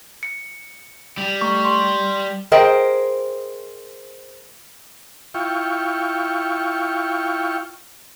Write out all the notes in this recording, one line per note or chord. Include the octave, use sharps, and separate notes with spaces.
C#7
G3
A3 C#6
C6
G#4 A#4 C5 D#5 G5
E4 F4 G5 C#6